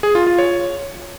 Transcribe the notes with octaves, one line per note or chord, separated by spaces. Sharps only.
G#4
F4
F4
C#5